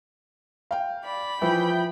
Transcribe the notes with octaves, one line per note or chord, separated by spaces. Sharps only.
F5 G5
D5 B5
E3 F3 G5 G6